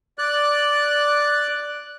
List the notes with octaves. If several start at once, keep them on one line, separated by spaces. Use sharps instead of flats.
D5 F#6